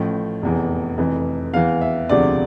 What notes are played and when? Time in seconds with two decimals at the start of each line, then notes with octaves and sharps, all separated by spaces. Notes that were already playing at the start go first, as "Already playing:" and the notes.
Already playing: A1 A2 F3
0.42 F1 E2 E3
0.98 F1 F2 E3
1.53 E2 E3 F5
1.81 E5
2.09 E1 D2 C3 F3 D5